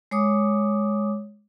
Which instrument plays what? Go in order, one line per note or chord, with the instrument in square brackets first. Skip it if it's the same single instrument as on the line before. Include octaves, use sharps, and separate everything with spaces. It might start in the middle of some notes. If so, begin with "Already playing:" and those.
[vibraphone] G#3 C#5 D6 D#6